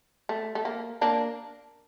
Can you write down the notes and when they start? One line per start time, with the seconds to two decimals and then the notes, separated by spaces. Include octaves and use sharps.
0.29 A3
0.55 A3
0.65 A#3
1.01 A#3 D4